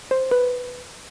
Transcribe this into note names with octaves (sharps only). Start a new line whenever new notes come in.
C5
B4